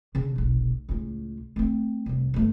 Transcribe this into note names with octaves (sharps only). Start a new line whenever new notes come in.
C#3 D4
F1 B1
C#2 A2
A3 C4
F1 C2
G1 A3